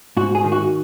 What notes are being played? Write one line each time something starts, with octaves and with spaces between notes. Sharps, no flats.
G#2 F#4
G#4
D#3
F#4